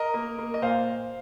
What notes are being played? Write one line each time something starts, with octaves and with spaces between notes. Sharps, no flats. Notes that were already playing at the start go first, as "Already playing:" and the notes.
Already playing: A#4 D#5
A#3
A#3
D#5
A#2 C5 F5